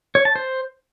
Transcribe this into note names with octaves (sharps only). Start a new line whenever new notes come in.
C#5
A5
C5